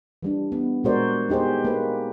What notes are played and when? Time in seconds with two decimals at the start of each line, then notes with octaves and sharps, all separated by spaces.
0.23 E3 G3 D4
0.52 B3
0.84 A#2 G#3 F#4 A#4 C5 D5
1.29 B3 D#4 G4 G#4 C5
1.65 A#3 B4 C5